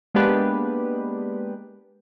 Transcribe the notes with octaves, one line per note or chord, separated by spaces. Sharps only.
G#3 A#3 B3 D4 G4 B4